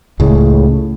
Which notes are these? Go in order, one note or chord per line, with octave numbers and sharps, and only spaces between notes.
C#2 A2 C#3